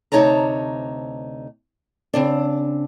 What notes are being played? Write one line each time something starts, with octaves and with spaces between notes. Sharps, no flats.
D2 C3 D#4 C#5 A5 A#5
C#3 C4 D4